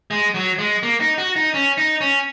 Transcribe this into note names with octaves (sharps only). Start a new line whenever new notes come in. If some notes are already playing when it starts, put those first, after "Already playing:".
G#3
F#3
G#3
A#3
D#4
F#4
D#4
C#4
D#4
C#4